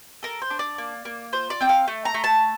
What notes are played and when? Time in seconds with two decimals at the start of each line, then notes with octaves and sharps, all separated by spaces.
0.23 A4 A#4
0.42 C5
0.50 D4
0.59 D5
0.78 A#3
1.05 A#3
1.33 F4 C5
1.50 D5
1.61 C4 G5
1.69 F5
1.88 A3
2.05 A#5
2.14 A3
2.24 A5